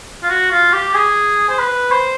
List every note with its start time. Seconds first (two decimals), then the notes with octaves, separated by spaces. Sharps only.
0.23 F4
0.29 F#4
0.51 F4
0.73 G4
0.94 G#4
1.49 C5
1.59 B4
1.91 C5